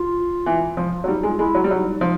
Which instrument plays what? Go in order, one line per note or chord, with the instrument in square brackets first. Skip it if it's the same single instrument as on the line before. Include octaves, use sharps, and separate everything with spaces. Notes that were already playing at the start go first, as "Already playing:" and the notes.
Already playing: [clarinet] F4
[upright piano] E3
F3
F#3
[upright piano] G3 [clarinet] D#4
[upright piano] G#3
[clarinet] F4
[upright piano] G#3 [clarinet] E4
[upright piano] F#3
G3
[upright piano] F#3 [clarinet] D#4
[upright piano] F3